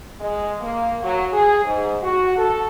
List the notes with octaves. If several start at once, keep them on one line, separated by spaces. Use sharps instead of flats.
G#3
A#3
F#3
G#4
G#2
F#4
A4